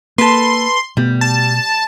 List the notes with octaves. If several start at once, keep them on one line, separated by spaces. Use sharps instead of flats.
A#3 A4 B4 C6
B2 G3 A3 B3
A5